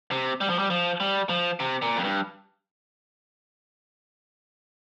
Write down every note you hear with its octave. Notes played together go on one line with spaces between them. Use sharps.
C3
G3
F3
G3
F3
G3
F3
C3
A#2
F2
G2